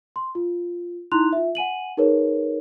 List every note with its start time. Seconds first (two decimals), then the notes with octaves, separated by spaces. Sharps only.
0.16 C6
0.35 F4
1.12 D#4 E4 A#5 C6 F#6 F7
1.33 F4 E5
1.55 F#5 G#5 D#7 F#7
1.97 D#4 G#4 A#4 B4 C#5